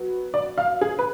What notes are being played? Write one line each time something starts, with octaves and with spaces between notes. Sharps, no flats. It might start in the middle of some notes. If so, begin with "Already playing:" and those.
Already playing: F#3 B3
D5
F5
G#4
B4